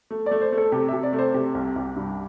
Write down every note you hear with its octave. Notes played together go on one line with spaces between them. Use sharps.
A3
A3 D5
C5
A3
A4
C3 G4
C3 E5
D5
A3
C5
C3 G4
C2
C2
G2